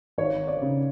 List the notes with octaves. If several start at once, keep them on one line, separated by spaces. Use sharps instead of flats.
G#1 C#5
D5
C#3